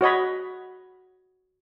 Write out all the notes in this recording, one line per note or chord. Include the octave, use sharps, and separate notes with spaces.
F#4 C#5 D#5 B5